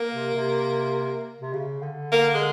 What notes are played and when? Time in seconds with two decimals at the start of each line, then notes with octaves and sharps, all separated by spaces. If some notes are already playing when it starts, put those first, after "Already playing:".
Already playing: A#3
0.13 C3
0.35 C3
1.41 C3
1.53 C#3
1.83 D3
2.12 A#3
2.34 G#3